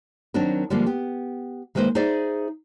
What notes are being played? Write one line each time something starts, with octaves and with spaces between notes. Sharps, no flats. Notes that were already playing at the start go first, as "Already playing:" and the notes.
D#3 F#3 C4 D4 F#4 A#4
D3 F3 G3 G#3 A#3
B3 G4
D#3 G#3 A#3 B4 C5
D#4 G#4 C5 D5 E5